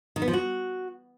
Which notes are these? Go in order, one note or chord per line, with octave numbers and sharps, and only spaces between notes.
D#3
B3
F3
F#4